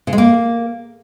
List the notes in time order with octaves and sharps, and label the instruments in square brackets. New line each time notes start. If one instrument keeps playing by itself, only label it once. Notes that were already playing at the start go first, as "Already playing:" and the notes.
[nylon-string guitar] C#3
G#3
A#3